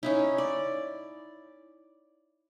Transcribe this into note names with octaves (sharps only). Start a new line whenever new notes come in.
C#4 D#4 E4
D5